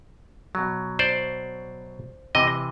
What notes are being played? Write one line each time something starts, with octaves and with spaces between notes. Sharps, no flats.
B2 F#3
C5 D5
C3 E3 D#5